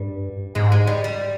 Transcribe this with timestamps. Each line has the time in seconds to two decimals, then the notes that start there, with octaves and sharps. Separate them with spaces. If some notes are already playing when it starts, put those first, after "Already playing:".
Already playing: G2 G3
0.55 G#2 G#3
0.72 G#3
0.87 G3
1.04 G3